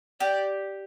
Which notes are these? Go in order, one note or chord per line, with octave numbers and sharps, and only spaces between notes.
G4 D5